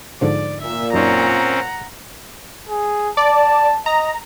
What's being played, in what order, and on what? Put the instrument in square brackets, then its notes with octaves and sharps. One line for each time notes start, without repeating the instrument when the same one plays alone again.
[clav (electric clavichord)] G#2 D3 F3 [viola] D5
[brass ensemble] A#2 [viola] E5
[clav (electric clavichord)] F#2 D#4 [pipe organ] C4 C#4 [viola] F#5 A#5
[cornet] G#4
[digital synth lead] D5 [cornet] A5
[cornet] D#5 [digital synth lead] A#5